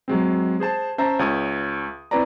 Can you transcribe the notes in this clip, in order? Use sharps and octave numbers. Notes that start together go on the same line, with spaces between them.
F#3 G#3 C4
G#4 C5 A5 E7
C#4 C5 E5 A5 A#5
C#2 C#5 E5 D#6
C4 E4 B4 C#5 D5 A#5